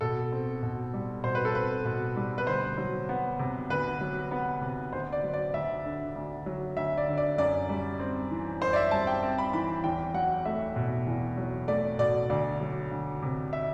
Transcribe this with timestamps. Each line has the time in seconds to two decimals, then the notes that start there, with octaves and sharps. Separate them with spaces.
0.01 B2 A4
0.32 C4
0.63 B2
0.93 G3
1.24 B2 C5
1.35 B4
1.45 A4
1.55 C4 B4
1.85 B2
2.16 G3
2.38 B4
2.46 D2 C5
2.78 F#3
3.09 B3
3.39 C3
3.70 D2 B4
4.01 F#3
4.31 B3
4.61 C3
4.93 D2 C5
5.12 D5
5.23 F#3
5.34 D5
5.54 D2 E5
5.85 D3
6.15 D2
6.46 F#3
6.77 D2 E5
6.98 D5
7.08 D3
7.17 D5
7.38 F#2 D5
7.69 G3
7.99 C4
8.31 E3
8.61 F#2 C5
8.73 D5
8.76 E5
8.91 G3 A5
9.07 G5
9.23 C4
9.38 B5
9.53 E3 B5
9.84 E2 G5
10.14 F#3 F#5
10.45 A3 E5
10.76 B2
11.07 E2
11.37 F#3
11.68 A3 D5
11.99 B2 D5
12.30 D2 D5
12.61 F#3
12.91 D2
13.22 C3
13.53 E5